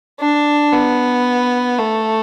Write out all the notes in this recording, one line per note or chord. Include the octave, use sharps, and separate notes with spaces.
D4
B3
A3